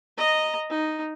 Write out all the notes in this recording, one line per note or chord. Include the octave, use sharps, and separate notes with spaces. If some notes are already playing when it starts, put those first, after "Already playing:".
D#5 A#5
D#4